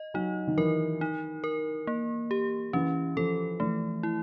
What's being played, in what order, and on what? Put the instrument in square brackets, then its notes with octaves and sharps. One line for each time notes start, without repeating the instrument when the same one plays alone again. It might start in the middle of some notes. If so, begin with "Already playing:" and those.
Already playing: [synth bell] D#5
[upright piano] F#3 [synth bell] D#4
[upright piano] D#3
[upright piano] E3 [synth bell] A#4
[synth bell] D#4
A#4
A#3
G4
[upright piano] E3 [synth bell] C#4
[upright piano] F3 [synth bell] A4
[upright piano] E3 [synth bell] A3
[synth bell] E4